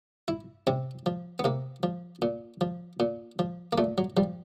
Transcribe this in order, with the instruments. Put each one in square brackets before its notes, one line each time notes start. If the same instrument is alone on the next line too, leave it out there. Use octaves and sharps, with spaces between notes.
[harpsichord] E4
C3 C4
F3
B3
C3 A#3
F3
A#2
F3
A#2
F3
A#3
A#2 A3
F#3
F3 G3